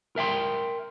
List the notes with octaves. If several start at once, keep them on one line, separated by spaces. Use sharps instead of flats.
A#4 E5 G5 C6